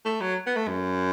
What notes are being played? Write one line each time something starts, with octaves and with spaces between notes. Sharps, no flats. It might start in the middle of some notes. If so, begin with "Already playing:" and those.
A3
F#3
B3
A3
F#2